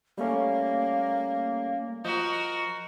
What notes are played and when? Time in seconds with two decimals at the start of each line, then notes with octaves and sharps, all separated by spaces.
0.18 G3 A3 A#3 C#4
2.05 F3 F#4 A#4 D#5 G6